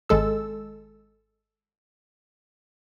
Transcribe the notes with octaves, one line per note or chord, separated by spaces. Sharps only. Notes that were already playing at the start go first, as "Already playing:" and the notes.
G#1 G#3 A4 E6